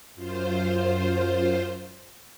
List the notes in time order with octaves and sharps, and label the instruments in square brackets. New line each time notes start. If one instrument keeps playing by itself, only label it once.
[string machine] F#2 F4 C5